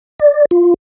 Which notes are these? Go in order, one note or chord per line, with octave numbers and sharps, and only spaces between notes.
D5
F4